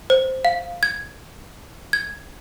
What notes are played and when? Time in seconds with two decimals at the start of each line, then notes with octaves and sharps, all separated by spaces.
0.10 C5
0.45 F5
0.83 G#6
1.93 G#6